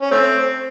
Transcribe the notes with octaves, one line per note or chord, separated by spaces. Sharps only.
C#4
A3 C4